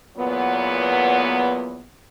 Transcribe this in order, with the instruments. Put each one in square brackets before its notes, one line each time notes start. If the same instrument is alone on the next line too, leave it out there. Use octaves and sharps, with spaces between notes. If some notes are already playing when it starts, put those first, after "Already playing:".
[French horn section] E2 A#2 F#3 B3